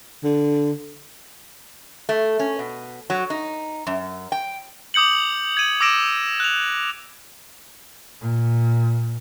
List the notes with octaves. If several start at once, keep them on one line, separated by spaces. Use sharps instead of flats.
D3
A3
C#4
B2
F#3
D#4
F#2
G5
D6 D#6 G6 C#7 F#7
G#6 D#7
D6 E6 A#6 D7 E7
F#6 F7
A#2